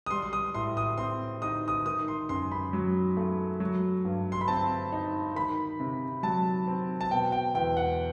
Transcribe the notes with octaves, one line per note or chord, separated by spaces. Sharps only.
D#6
G3 C6
C6
D#6
A2 C6
D#6
C4 C6
D#4 D#6
D#6
D#3 D#6
C6
F#2 C6
B5
F#3
A3
F#3
G2
C6
B5
C4 A5
D#4
D#3 B5
C3
F#3 A5
C4
A5
B2 G5
G5
E2 G5
F#5